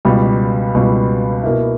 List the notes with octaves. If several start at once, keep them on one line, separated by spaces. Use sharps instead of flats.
C#2 B2 G3
C#2 B2 G3
B2 A#3 E4